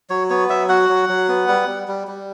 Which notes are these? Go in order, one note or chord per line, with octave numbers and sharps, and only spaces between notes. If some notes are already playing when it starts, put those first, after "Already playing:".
F#3 C#5
B3 C#5
F#3 E5
F#4 F#5
F#3
F#3
B3
G3
G3
G3
G3